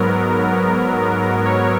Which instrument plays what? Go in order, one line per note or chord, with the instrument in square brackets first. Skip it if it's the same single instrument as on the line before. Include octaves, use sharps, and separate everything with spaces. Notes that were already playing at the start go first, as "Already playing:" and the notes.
Already playing: [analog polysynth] G#2 F#3 B3 A#4
C#5